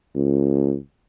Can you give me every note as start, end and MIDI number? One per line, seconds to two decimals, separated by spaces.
0.15 0.76 37